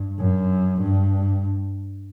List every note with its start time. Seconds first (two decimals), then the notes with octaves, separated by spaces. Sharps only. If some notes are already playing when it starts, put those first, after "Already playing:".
Already playing: G2
0.19 F#2
0.81 G2